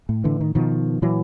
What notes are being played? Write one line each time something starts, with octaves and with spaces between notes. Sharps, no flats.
A2
D3 E3
D#3
B2 D#3 F3
A#2 E3 F#3